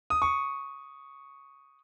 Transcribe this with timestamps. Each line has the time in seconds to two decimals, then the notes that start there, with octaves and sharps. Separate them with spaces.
0.10 D#6
0.22 C#6